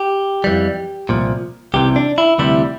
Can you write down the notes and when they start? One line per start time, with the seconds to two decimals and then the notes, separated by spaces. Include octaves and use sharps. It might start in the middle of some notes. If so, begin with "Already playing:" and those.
Already playing: G4
0.44 F2 E3 G3
1.09 C2 A#2 F3
1.74 C2 C3 E3 G4
1.96 D4
2.18 E4
2.38 D2 C3 E3 G3 E4